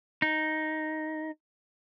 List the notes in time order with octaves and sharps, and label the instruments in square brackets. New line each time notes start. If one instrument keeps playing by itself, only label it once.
[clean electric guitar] D#4